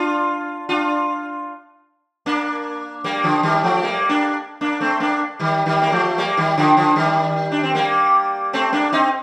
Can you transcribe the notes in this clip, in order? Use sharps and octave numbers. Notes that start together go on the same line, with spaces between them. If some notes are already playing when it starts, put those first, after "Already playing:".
Already playing: D4 F4
D4 F4
A#3 D4
G3 A#3
D3 F3
D#3 G3
F3 A3
G3 A#3
A#3 D4
A#3 D4
A3 C4
A#3 D4
D#3 G3
D#3 G3
A#3
F3 A3
G3 A#3
D#3 G3
D3 F3
D3 F3
D#3 G3
D4
C4
G3 A#3
A3 C4
A#3 D4
C4 D#4